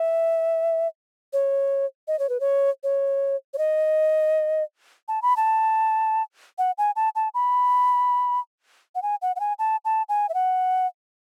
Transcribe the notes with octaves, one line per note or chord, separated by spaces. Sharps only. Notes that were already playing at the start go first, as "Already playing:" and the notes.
Already playing: E5
C#5
D#5
C#5
B4
C#5
C#5
C#5
D#5
A5
B5
A5
F#5
G#5
A5
A5
B5
F#5
G#5
F#5
F#5
G#5
A5
A5
G#5
E5
F#5